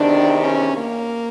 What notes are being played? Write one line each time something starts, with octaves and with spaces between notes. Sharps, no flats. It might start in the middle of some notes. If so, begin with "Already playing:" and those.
Already playing: E2 C3 D#3 D4
C#4
A#3